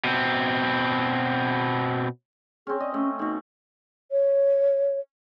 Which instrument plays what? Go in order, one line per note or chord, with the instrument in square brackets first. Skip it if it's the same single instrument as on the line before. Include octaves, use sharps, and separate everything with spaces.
[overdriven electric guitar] B2 C4
[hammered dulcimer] C4 C#4 [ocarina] G#4
[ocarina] D5 [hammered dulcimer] D#5
[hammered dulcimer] A3 [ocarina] C#4
[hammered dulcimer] B2 A3 [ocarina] D#4
[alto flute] C#5